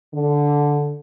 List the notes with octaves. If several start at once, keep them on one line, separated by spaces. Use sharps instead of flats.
D3